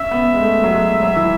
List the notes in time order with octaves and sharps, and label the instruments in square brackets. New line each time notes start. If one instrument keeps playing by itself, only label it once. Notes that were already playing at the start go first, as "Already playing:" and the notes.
Already playing: [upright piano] C#4 [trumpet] E5
[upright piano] B3
G#3
A3
F#3
G#3
F#3
E3